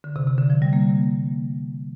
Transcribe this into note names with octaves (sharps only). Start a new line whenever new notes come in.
D3
C3
C3
D3
F3
G3
A#3